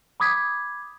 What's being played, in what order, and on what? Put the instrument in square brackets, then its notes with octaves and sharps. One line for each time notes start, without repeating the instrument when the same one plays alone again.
[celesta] B5 D6 D#6 G#6 B6